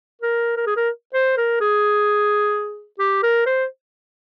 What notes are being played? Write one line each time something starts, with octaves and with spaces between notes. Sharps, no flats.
A#4
A#4
G#4
A#4
C5
A#4
G#4
G4
A#4
C5